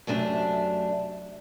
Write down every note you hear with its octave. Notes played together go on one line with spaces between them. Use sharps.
F#2 C3 A3 D4